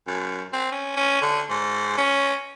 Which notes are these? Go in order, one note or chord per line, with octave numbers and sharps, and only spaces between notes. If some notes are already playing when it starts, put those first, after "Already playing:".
F#2
C4
C#4
C#4
D3
G#2
C#4